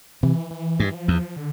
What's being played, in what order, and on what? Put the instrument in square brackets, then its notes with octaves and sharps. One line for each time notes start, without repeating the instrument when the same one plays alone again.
[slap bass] C3 [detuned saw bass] E3
[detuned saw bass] E3
[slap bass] G2
[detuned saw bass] F3
[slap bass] E2
[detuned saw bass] D3